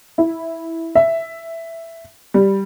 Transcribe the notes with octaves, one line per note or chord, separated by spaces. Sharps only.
E4
E5
G3